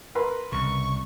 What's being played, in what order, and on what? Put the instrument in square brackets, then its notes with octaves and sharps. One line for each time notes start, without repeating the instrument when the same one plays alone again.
[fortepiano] A#4 B4 C6
[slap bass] C2 C#3 [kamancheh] C#6